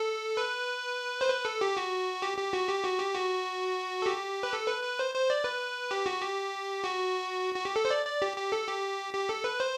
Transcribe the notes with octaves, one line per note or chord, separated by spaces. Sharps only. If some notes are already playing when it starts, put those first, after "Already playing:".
Already playing: A4
B4
C5
B4
A4
G4
F#4
G4
G4
F#4
G4
F#4
G4
F#4
A4
G4
B4
A4
B4
B4
C5
C5
D5
B4
G4
F#4
G4
F#4
F#4
G4
A4
C5
D5
D5
G4
G4
A4
G4
G4
A4
B4
C5